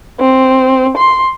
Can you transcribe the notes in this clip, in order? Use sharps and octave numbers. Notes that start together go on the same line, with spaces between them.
C4
C6